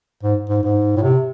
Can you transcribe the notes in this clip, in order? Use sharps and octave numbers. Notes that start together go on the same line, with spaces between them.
G#2
G#2
G#2
A2
C3